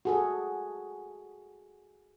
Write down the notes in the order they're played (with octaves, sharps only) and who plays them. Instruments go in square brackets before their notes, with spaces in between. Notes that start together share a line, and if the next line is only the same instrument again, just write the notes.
[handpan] F#4 G#4 A4